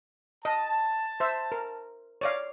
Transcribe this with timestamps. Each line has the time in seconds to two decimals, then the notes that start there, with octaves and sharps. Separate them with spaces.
0.45 D#5 A5
1.20 C5 E5
1.52 A#4
2.21 C#5 D5 F5